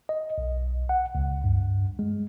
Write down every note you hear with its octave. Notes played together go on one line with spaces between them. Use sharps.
D#5
B1
F#5
C#2
G2
G#3